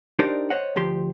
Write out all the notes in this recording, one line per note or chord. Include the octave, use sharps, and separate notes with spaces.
D4 D#4 G4 A#4 C5 D5
C5 C#5 D#5 F#5
D2 F3 G4 C6